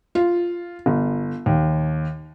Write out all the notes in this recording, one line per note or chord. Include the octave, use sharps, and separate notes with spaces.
F4
G1
D#2